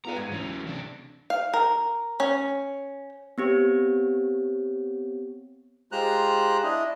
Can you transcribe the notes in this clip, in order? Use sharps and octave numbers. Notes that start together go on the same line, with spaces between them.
B3 F4 G4 B4 A#5
G#2 G#6 D#7
D2 E3 F#3 C#4 F7
C3 D4
F5
A#4
C#4
B3 C4 G4 C#5
G#3 F4 G4 C5 A#5 F#6
D4 E4 D#5